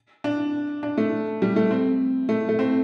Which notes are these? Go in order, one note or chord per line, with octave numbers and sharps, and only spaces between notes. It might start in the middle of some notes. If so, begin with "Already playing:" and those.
D4
D4
A3
G3
A3
C4
A3
A3
C4